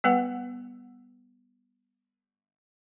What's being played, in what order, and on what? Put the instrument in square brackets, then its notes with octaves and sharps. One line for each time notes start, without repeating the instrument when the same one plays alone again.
[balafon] G3 B3 B4 F#5